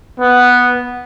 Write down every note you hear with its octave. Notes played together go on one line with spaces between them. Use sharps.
B3